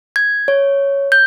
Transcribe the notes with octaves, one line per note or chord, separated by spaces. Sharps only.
G#6
C#5
G6